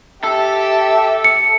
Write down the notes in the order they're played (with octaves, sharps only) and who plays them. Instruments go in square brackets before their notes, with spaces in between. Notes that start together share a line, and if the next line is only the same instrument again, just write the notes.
[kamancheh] G4 E5 [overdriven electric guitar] A4
[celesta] C#7